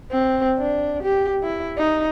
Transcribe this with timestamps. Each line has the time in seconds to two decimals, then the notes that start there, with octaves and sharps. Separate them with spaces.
0.12 C4
0.59 D4
1.03 G4
1.43 E4
1.78 D#4